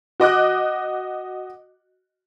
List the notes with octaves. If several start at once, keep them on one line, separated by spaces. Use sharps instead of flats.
F#4 D#5 D6 F#6